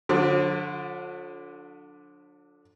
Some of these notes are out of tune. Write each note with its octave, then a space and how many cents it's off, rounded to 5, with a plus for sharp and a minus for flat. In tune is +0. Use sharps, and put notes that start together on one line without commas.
D3 +0 F3 +45